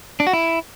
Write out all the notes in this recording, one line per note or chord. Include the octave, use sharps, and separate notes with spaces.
D4
F#4
E4